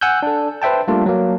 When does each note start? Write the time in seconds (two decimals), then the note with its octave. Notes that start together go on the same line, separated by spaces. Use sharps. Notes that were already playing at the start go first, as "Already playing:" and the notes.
0.01 F#5 G#5 E6 F#6 G6
0.23 D4 A4
0.62 B4 C5 E5 G5 A5
0.88 G3 A3 A#3 D4 F4
1.06 F#3 A#3